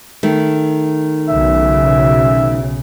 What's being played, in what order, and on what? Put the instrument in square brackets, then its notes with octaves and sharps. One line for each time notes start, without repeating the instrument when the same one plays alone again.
[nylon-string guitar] D#3 A3
[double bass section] B1 C#3 [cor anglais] E5